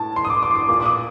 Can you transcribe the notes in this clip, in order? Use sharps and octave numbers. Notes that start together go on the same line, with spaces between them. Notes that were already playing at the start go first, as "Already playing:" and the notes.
Already playing: A2 A5
C6
D#6
D6
D6
C6
D6
A#2 D6
D6
D#6